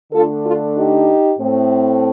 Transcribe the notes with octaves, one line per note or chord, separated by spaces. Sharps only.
D3 A3 D4 F4 A4
F4 A4
D#4 G4
A2 A3 C4